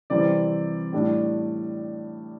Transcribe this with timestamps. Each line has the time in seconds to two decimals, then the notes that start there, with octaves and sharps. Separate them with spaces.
0.10 C3 E3 G3 C4 D5
0.93 A2 G3 D4